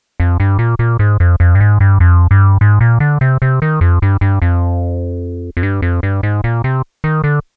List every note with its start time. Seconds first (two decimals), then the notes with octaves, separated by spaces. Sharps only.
0.20 F2
0.40 G2
0.59 A#2
0.79 A#2
0.99 G#2
1.20 F2
1.40 F2
1.55 G2
1.61 G#2
1.80 G2
2.00 F2
2.31 G2
2.61 G#2
2.81 A#2
3.00 D3
3.21 C3
3.42 C3
3.62 D#3
3.81 F2
4.02 G2
4.21 G2
4.42 F2
5.57 F2
5.63 G2
5.82 F2
6.03 G2
6.23 G#2
6.44 A#2
6.64 C3
7.04 D#3
7.24 D3